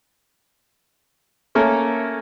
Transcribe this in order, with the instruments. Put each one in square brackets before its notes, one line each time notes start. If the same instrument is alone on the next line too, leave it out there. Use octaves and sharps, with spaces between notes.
[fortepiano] A3 A#3 C#4 A4 A#4